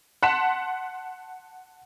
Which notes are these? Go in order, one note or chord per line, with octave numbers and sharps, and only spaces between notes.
F#5 A5 C6 B6 E7